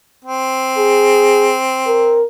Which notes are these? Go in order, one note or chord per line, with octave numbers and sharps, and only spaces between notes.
C4
G#4
A#4